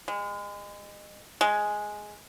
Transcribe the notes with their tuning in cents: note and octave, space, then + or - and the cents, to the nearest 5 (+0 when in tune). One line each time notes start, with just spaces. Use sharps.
G#3 -30
G#3 +5